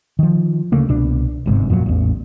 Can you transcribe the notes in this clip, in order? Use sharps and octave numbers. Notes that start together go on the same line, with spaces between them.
D#3 F3
D2 C#3 A3 A#3
C2 B2 D4
G1 G#2 C3
F2 A#2 F3 F#3
A1 E2